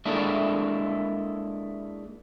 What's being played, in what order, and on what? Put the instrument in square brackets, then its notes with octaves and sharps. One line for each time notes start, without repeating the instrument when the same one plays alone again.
[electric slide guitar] G#3 A#3 D4 E4 A4